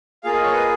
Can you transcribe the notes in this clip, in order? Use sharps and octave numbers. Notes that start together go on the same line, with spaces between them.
A#3 F4 G#4 F5
D#5
C#5
B4 D#5